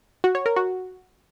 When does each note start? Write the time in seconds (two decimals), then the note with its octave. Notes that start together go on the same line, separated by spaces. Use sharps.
0.24 F#4
0.35 C#5
0.46 A#4
0.56 F#4